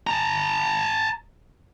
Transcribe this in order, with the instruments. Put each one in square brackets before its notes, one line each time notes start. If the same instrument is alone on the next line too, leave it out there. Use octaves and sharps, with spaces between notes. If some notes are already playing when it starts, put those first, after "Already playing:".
[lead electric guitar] A5 A#5